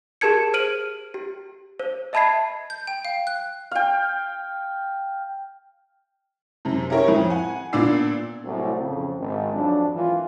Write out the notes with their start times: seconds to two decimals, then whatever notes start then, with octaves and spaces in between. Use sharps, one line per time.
0.21 G4 G#4 A#4 A5 G#6 C#7
0.54 C5 F6 D7 D#7 F#7
1.14 G4
1.79 C5
2.13 D#5 E5 A5 B5 G#6 C7
2.70 G6
2.87 G5
3.05 F5
3.27 F#6
3.71 F5 G5
6.65 F#2 C3
6.90 C#4 E4 G4 A#4 E5 C#6
7.07 F2 A2
7.30 F#5 G#5
7.73 A#2 B3 D4 D5 E6 C7
8.45 C2 A2 C3 F#3
8.80 F2 C#3
9.20 G#1
9.54 F2 F#3 D4
9.95 G#1 E3 F4